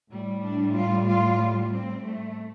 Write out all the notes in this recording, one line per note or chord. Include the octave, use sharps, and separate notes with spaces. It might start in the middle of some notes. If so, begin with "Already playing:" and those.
A2 G3
D4
F4
F4
C4
A3